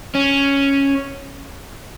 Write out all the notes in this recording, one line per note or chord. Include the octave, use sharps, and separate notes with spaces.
C#4